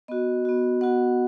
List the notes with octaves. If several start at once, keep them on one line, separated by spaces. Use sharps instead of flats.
B3 F#4 D#5
B3 F#4
B3 F#4 F#5